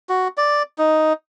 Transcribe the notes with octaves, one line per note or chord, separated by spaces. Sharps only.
F#4
D5
D#4